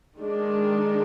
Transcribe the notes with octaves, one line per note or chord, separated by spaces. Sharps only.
D#3 G#3 D4